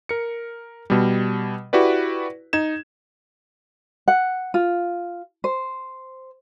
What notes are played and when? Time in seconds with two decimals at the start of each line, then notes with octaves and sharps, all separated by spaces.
0.09 A#4 C#7
0.90 B2 G3
1.73 E4 F#4 G4 B4 D5
2.53 D#4 G#6 E7
4.08 F#5
4.54 F4
5.44 C5